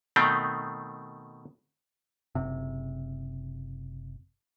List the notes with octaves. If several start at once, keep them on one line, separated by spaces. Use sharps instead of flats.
B2 D#3 A3 C4
F#1 C3